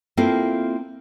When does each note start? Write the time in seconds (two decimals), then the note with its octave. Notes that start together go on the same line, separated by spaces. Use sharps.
0.17 A#3 C4 E4 F4 A4